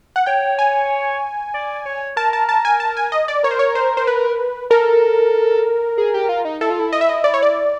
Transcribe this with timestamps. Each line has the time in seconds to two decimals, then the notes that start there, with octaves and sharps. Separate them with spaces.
0.16 F#5
0.26 C#5 G5
0.59 G#5
1.54 D5
1.86 C#5
2.16 A#4 A5
2.33 A5
2.49 A5
2.65 G#5
2.80 A5
2.97 G#5
3.12 D#5
3.28 D5
3.43 A#4 C#5
3.51 C5
3.59 C#5
3.75 C5
3.97 C5
4.07 B4
4.70 A4 A#4
5.98 G#4
6.14 G4
6.29 F4
6.45 D#4
6.61 E4 A4
6.70 F4
6.79 E4
6.93 D#5
7.01 E5
7.09 D#5
7.24 D5
7.34 C#5
7.43 D5